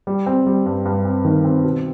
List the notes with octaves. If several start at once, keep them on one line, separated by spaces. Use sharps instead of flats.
G3
C4
G3
G2
G2
C4
D#3
C4
B2